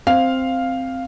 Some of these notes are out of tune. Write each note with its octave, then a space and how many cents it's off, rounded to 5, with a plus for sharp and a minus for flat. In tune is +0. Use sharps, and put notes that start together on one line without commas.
C4 +0 F5 +0